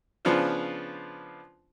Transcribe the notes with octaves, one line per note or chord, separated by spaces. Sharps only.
C#3 F3 B3 D4 F4 C5